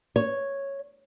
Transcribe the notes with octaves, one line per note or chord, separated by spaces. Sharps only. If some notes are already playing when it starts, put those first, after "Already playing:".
C#5